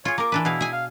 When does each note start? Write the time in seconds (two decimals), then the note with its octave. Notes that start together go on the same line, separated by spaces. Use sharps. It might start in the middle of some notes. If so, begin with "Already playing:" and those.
0.05 F4 G#4 C#5
0.18 A#3 A#4 D6
0.32 E3 D4 B4
0.45 B2 E4 G#4 F5
0.61 G#4 G#5
0.73 F5